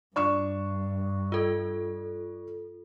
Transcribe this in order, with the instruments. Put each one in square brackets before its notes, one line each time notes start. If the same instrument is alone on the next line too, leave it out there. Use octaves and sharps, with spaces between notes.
[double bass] G2 [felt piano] D4 C#6 E7
[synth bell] F4 A4